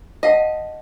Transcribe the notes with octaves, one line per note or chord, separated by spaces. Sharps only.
D#5 F5 F#5 A5